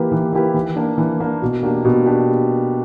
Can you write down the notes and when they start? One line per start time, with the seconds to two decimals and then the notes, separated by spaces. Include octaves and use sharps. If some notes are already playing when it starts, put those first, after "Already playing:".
Already playing: E3 A#3 E4 G4 B4
0.12 E3
0.33 A#3 E4 G4 B4
0.54 E3
0.76 A#3 D4
0.98 E3
1.20 A#3 D4
1.42 B2
1.63 A#3 D4 G4
1.85 B2
2.06 D4 G4